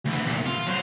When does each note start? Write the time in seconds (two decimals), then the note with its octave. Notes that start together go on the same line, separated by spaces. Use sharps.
0.06 D2 E3
0.25 C2 A#2
0.47 F4
0.67 F#3 C5